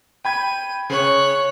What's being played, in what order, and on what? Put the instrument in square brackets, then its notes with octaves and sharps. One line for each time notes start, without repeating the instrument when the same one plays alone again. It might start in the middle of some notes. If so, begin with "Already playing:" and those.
[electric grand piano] G5 B5 G#6 [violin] D#7
[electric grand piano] C#3 [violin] C#5 F#6